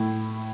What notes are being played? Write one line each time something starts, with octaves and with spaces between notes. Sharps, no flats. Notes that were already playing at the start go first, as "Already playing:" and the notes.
Already playing: A2 E4